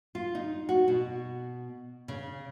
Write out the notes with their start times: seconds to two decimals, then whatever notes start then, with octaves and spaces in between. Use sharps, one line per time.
0.15 F4
0.35 D#4
0.69 F#4
0.88 B2
2.08 C#3